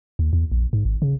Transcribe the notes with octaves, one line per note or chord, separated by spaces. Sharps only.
D#2
E2
A#1
G#2
G#1
C#3